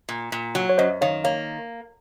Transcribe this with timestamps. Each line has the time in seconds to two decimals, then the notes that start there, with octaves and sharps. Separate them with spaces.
0.09 A#2
0.32 A#2
0.55 F#3
0.69 C#5
0.78 F#2 C5 D#5
1.01 D#3 C#5 F5
1.24 A#3 C#5 F5